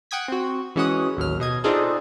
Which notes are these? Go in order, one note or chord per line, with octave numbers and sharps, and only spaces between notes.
F#5 G5 D#6 G#6 B6
C4 F#4
E3 G#3 C#4 F#4 F#5 D#6
A1 D#2 F#3 F6
B2 D#5 G#6
C4 D4 D#4 F4 G#4 A4